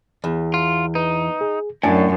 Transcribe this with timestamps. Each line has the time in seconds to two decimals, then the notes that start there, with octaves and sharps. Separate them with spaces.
0.24 E2
0.54 F4
0.95 D#4 B4
1.41 G#4
1.83 F#2 A2 D4 G#5